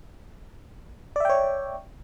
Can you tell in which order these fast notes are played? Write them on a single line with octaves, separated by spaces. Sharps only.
D5 E5 G5 C#5